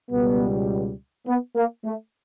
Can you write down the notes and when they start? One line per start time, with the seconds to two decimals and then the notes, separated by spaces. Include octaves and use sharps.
0.10 C#2 B2 G3 B3
1.27 B3
1.56 A#3
1.85 A3